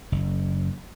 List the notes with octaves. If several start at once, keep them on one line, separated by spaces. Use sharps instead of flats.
F#1